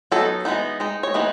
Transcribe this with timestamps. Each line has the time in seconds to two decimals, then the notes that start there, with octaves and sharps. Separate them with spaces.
0.12 F#3 B3 D#4 A4
0.45 E3 G#3 B3 D#4
0.80 G#3 D#4
1.03 C#5
1.14 E3 G#3 B3 D#4